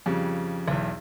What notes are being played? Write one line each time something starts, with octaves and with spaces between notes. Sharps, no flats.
F2 C#3 G3
B1 E2